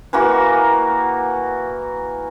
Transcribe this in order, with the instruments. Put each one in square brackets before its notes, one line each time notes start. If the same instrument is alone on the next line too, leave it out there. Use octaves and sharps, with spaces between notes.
[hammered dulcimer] E3 A#3 F#4